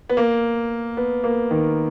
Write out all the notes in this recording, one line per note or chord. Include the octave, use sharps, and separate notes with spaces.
B3
A#3
B3
A#3
D#3